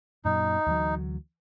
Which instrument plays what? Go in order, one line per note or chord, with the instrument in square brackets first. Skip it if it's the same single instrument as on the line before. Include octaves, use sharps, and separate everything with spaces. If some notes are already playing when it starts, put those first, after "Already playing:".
[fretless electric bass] F#2 A#2 F#3 [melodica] D#4
[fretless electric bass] D2 E3 F#3